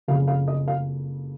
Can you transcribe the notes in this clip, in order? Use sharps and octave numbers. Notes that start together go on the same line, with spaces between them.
F#1 F2 C#3 F5
F5
D#5
F5